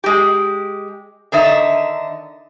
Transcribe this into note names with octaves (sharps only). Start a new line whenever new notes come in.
G#3 G4
D3 D#3 D#4 E5